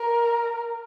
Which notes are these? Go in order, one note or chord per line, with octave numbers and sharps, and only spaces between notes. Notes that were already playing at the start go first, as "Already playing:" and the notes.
Already playing: A#4